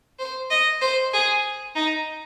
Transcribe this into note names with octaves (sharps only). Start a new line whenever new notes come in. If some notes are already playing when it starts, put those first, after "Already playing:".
C5
D#5
C5
G#4
D#4